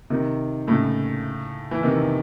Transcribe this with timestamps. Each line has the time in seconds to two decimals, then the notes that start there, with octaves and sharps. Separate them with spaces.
0.10 C3 D#3
0.67 A2 C#3
1.71 E3
1.83 C3 D#3